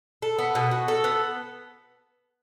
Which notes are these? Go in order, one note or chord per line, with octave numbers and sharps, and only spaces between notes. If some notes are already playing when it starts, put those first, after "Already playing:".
A4
B3
B2
F#4
A4
B3